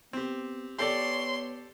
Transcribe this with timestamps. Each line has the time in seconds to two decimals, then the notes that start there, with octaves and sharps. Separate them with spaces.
0.13 B3 C4 G4
0.78 B3 G4 A4 C#5 D5 C6